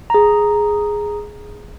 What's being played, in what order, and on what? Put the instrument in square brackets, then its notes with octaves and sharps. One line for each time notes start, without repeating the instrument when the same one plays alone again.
[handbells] G#4 A#5